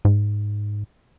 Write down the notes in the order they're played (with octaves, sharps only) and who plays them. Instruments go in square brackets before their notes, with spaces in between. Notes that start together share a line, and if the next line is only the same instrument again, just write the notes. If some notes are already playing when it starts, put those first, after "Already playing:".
[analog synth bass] G#2